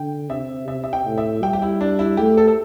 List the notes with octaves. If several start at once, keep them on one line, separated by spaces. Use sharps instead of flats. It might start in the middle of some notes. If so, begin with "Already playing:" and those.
Already playing: D3 G5
C3 E5
C3 E5
E5
G5
A2
E5
G3 G5
G4
E4
D4
E4
A3 G4
A4
A4